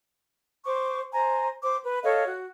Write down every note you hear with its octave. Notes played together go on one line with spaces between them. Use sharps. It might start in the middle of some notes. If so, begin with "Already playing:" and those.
C5 C#6 D6
C5 G#5 A#5
C5 D6
B4
A4 C#5 D#5 F5
F#4